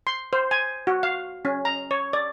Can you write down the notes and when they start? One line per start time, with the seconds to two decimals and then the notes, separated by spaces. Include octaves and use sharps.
0.07 C6
0.33 C5
0.51 G#5
0.87 F#4
1.03 F5
1.45 C#4
1.65 A#5
1.91 C#5
2.13 D5